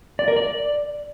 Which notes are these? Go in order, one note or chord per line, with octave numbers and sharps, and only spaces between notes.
D5
A#4
D5